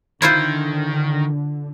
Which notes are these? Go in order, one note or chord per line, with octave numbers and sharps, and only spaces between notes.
D3 D#3 E4 F4 C5